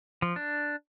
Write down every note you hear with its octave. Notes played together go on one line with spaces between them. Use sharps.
F3
D4